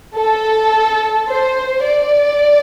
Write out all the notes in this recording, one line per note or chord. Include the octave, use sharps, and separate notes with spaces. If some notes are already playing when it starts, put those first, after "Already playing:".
A4
C5
D5